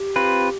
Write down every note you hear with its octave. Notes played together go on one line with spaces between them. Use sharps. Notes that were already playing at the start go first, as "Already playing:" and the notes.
Already playing: G4
C4 F4 B4